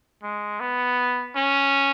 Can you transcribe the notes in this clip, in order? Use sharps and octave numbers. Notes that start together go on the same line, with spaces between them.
G#3
B3
C#4